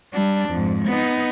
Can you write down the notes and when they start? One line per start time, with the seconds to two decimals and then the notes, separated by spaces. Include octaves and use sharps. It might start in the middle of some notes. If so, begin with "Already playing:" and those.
0.13 G3 D4
0.49 F2 G#2
0.86 B3 D#4